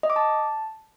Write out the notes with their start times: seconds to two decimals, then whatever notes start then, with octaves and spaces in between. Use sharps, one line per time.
0.03 D#5
0.10 D6
0.16 A5